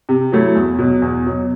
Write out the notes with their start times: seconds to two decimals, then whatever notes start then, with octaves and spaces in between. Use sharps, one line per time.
0.09 C3
0.32 F#3 A3 E4
0.56 E2
0.79 B2 F#3
1.02 E2
1.26 B2 F#3